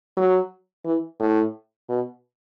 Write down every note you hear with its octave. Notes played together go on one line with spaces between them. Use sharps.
F#3
E3
A2
B2